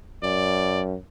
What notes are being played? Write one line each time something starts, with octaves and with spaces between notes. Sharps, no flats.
F#2 D5